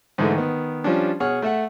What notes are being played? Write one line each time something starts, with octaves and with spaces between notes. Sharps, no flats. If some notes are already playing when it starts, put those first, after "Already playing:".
G#2 D3 E3 G#3 A3
D#3 B3
F3 G3 C#4 D4
B2 G#4 C#5 F#5 F6
A3 E5 F#5